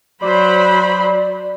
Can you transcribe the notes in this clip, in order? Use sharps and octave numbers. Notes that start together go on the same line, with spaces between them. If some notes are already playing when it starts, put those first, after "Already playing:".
F#3 C5 D5 B5